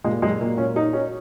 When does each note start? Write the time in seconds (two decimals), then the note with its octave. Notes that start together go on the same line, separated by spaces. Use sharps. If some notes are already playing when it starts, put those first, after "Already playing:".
0.04 A#2 G#3
0.22 F#3 G#3
0.41 A#2 A#3
0.58 A#2 C#4
0.76 D#4 F#4
0.93 C#4 F#4